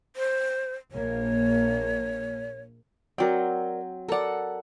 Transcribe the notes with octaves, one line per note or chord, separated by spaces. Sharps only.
C5
A#1 A#3 C#5
F#3 C4 A#4 D5 G5
A4 A#4 D5 F#5